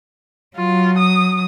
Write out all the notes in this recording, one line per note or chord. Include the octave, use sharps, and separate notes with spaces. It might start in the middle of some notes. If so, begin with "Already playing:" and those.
F#3 F4
D#6